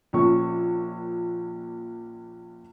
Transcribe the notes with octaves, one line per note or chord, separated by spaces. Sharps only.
A#1 A#2 C#4 C#6